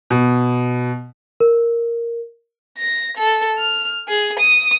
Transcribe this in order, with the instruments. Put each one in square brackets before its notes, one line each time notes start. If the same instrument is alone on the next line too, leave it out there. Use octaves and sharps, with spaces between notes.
[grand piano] B2
[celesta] A#4
[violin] A#6
A4
F6
G#4
D#6